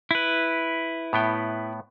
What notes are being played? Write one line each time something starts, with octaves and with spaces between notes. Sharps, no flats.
E4 B4
A2 B3 G5